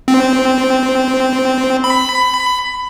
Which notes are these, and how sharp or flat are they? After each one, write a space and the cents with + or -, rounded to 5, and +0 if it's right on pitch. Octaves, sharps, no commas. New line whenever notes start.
C4 -10
B5 +15